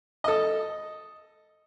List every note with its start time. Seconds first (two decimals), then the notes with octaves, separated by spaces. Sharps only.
0.24 A4 D#5